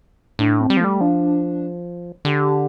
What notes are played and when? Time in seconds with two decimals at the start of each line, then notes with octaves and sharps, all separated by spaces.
0.39 A2 D4
0.60 C4
0.70 G3
0.77 F3
0.80 G3 A3
1.01 F3 D4
2.25 D3 G4